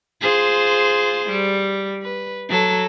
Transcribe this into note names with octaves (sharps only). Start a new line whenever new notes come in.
F4 G#4 C5
G3
B4
F#3 A4